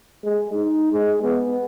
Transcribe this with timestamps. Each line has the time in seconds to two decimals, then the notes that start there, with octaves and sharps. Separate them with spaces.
0.24 G#3
0.53 D#4
0.93 G#3
1.23 B3